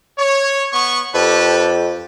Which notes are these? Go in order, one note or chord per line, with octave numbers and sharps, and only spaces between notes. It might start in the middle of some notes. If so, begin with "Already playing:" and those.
C#5
B3 C#6
F2 G4 A4 B4